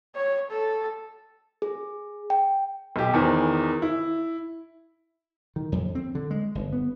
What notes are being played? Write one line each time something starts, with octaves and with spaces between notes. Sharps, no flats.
C#5
A4
G#4
G5
B1 G4
E2 D#3 E3 C5
E4
D#3
F2
C4
D3
G#3
G1
B3